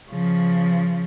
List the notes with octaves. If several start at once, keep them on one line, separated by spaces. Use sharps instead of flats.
C#3 F3